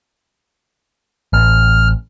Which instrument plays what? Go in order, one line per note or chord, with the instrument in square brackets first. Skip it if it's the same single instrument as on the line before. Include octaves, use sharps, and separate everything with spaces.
[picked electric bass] A1 [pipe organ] F6